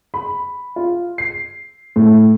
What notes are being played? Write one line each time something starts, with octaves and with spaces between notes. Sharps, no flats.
B5
F4
C7
A2